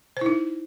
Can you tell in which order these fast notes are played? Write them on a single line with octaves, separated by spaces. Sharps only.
C5 E4 D#4